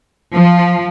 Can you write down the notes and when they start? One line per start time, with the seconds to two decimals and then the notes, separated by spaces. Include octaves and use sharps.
0.33 F3